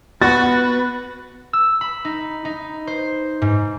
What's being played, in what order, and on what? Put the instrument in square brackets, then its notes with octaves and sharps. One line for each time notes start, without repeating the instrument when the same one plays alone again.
[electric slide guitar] B3 [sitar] F#4 [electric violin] B4 [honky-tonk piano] A6
[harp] E6
B5
D#4
D#4
C5
G#2